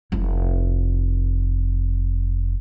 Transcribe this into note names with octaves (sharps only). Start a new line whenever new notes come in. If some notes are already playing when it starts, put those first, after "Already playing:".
F1 E4